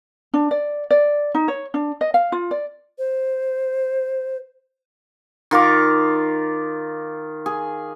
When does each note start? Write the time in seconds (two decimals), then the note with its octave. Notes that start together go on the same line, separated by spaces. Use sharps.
0.34 D4
0.51 D5
0.90 D5
1.35 D#4
1.48 C#5
1.74 D4
2.01 D#5
2.14 F5
2.32 F4
2.51 D5
2.99 C5
5.51 D#3 F4 A#5 D6
7.46 G#4